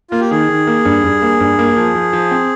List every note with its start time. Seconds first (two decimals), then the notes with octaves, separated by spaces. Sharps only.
0.11 A#3 F4
0.20 G4
0.30 D#3 G#4
0.49 D#3
0.67 A#3
0.85 G2
1.04 G2
1.22 A#3
1.40 G2
1.59 A#3
1.77 F3
1.95 F3
2.13 F3
2.31 C4